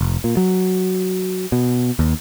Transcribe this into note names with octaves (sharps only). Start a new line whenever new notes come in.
F1
A#2
F#3
B2
D#2